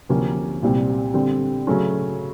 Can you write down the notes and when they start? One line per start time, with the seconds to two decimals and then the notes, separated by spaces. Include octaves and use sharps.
0.09 D2 C3 F3 A#3 C#4
0.62 C2 A#2 G3 C4
1.14 D3 G3 C4
1.67 C#3 F#3 A3 C#4